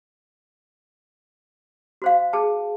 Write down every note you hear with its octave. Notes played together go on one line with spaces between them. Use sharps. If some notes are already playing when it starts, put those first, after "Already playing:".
F#4 C5 F5
G#4 A5